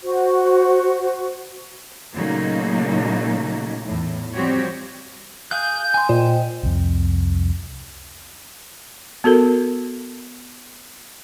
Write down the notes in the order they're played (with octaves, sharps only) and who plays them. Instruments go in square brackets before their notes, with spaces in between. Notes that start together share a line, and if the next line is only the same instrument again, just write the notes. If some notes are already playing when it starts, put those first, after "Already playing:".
[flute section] F#4 C5
[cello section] A#2 C#3 F#3 A3 A#3 D#4
E2 A2
F3 G3 C4 F#4 G4 C#5
[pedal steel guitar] G#4 F5 F#6 [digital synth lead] G6
[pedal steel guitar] G#5 C6
[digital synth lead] A#2 [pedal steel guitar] C5 D#5 G5
[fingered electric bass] C2 F2
[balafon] B3 F#4 A4 A#4